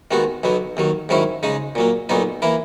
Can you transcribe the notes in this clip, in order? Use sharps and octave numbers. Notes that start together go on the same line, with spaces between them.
D#2 D#3 G#3 B3 F#4
B1 B2 F#3 B3
D#2 D#3 F#3
G#2 D#3 F#3 C#4 E4
C#3 G#3 D#4
A#2 F#3 A#3
B1 A#2 F#3 B3 D#4
E3 A#3 E4